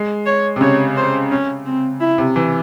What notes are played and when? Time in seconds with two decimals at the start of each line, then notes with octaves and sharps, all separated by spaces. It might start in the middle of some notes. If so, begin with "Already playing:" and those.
Already playing: G#3
0.26 C#5
0.56 C3
0.61 C#3 C#5
0.97 C5
1.31 C#4
1.66 C4
2.00 E4
2.18 C3
2.36 E3